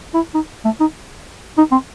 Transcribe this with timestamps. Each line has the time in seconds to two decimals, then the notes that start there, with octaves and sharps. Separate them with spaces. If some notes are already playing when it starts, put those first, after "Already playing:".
0.14 E4
0.34 D#4
0.65 A3
0.80 D#4
1.57 D#4
1.71 C4